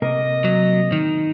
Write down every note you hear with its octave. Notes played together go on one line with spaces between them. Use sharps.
C3 A#3 A#4 D#5
F#3
D#3